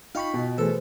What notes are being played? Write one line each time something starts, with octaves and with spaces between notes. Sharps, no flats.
D#4 F4 D#5 F5 G5 B5 C#6
B2
E3 A3 G#4 A4 B4 C5